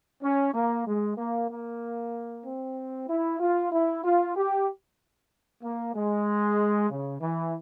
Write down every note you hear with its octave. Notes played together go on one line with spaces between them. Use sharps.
C#4
A#3
G#3
A#3
A#3
C4
E4
F4
E4
F4
G4
A#3
G#3
C#3
E3